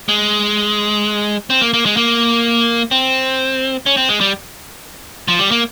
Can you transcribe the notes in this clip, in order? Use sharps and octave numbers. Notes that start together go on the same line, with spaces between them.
G#3
C4
A#3
A#3
G#3
A#3
C4
C#4
C4
G#3
G3
F3
G3
A#3